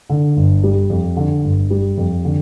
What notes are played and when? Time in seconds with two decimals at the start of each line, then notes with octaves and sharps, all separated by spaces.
0.10 D3
0.37 G1
0.64 G3
0.90 F2
1.17 D3
1.44 G1
1.71 G3
1.98 F2
2.25 D3